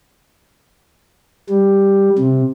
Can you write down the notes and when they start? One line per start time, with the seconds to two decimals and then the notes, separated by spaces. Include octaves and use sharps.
1.49 G3
2.19 C3